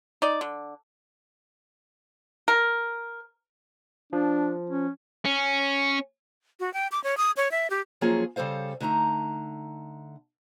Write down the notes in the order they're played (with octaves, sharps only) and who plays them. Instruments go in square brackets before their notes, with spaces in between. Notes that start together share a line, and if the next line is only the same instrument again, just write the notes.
[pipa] D#4 D5
D3
A#4
[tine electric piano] F3 [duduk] D4
[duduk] C#4
[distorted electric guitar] C#4
[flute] F#4
G5
D6
C#5
D#6
C#5
E5
G4
[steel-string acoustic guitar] F3 F#3 A#3 C#4 F4 G#4
C#3 G3 A4 C5 F5
D3 A3 D#4 A5 A#5